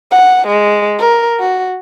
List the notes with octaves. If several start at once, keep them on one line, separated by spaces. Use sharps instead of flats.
F#5
G#3
A#4
F#4